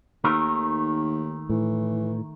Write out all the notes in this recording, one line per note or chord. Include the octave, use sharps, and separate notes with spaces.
D#2 D#3 A3 A#4
A2 E3